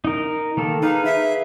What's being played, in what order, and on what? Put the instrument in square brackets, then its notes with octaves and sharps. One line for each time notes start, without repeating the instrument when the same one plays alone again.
[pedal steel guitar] D#4 A#4
D#3 A#3 A4
[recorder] D#4 [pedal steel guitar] G#4 B4 F5
[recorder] E5